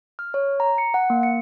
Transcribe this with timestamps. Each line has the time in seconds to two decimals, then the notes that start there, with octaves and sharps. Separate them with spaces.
0.19 F6
0.34 C#5
0.60 A#5
0.78 C#7
0.94 F#5
1.10 A#3
1.23 C#7